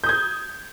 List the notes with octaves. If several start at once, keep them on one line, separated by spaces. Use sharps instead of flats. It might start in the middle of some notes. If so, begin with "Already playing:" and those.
D#6 G6 G#6